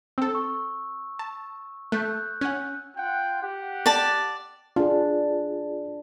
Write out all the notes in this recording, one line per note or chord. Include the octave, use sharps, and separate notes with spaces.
C4 A4 E6
C#6
A5
A3 F#6 G6
C#4 F#5 F#6
F4 F#5 G5
G4 F#5
D5 A5
D4 F4 G#4